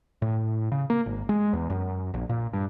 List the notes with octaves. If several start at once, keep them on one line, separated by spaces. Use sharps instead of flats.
A2
C#3
A#3
G#1
G#3
E2
F#2
A#1
A#2
G2